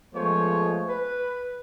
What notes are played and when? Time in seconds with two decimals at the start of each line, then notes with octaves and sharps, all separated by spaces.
0.15 F3 G#3 A3 B3 C5 C#5
0.88 B4